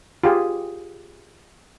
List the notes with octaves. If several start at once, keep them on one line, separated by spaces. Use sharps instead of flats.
F4 G4 G#4